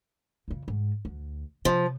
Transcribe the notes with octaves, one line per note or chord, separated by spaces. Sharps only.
F2 C#3
G#2
D2
C3 F3